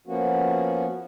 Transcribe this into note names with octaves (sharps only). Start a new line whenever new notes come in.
F3 A#3 B3 C#4 F#4